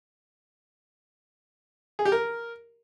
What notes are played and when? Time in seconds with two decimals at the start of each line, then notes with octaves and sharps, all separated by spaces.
1.99 G#4
2.05 G4
2.12 A#4